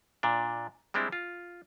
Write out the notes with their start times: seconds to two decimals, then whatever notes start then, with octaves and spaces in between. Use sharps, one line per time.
0.23 A#2 D4
0.94 G3 G#3 C4 D4 E4
1.12 F4